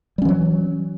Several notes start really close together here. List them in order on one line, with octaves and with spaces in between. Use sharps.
G3 C#4 E3 F#3